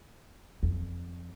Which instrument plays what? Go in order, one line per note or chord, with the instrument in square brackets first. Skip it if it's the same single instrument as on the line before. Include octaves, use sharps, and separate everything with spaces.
[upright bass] F2